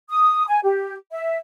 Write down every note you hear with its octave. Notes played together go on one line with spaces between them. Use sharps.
D#6
G#5
G4
E5